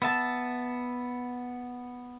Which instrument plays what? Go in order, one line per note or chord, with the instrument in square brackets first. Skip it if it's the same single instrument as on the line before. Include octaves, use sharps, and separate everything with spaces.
[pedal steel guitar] B3 E5 A5